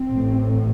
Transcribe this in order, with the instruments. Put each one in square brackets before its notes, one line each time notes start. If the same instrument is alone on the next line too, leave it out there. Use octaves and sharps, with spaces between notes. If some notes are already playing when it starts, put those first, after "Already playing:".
Already playing: [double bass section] C4
A1 A2